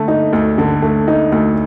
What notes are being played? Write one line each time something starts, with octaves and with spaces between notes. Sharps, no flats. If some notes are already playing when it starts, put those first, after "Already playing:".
Already playing: D3 A3
D#4
D2
D3
A3
D#4
D2